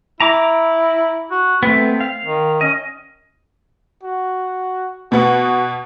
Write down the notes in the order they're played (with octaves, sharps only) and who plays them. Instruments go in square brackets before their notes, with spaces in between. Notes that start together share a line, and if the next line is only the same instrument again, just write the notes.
[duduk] E4 [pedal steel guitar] A#5 D6
[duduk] F#4
[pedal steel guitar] A3 B3 [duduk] C4
[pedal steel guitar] F5
[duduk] D#3
[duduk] C#4 [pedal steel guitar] D#5
[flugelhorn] F#4
[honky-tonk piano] B2 B3 F#5 [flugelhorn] F#4